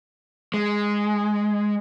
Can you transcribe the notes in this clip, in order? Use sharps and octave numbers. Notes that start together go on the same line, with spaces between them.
G#3